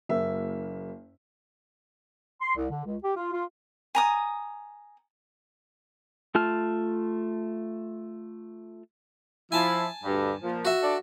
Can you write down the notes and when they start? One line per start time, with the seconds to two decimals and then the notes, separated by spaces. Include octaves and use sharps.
0.09 F#1 A#3 E5
2.41 C6
2.56 C2
2.70 D3
2.85 C#2
3.03 G4
3.16 F4
3.33 F4
3.95 G#5 A#5 D#6
6.35 A3 F4 A5 F6
9.52 F3 E4 G#5 A5
10.04 D2 G2
10.43 A#2 F3
10.65 F#4 E5
10.83 D4 A4 D5